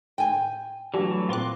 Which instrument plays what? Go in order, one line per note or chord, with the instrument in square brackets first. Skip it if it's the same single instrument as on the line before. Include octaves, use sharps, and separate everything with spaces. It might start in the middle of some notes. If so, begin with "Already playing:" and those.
[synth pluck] A2 [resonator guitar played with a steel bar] G5 G#5
[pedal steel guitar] E3 F#3 A3 [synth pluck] G3 D4 F#4
[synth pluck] A#2 C4 F#6 [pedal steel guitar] F4 C6 D6